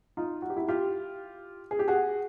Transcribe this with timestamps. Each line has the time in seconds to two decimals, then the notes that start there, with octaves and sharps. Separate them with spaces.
0.17 D#4 F4
0.42 F#4
0.50 G4
0.57 E4 F#4
0.68 F4 G4
1.71 G#4
1.79 G4
1.88 F#4 G#4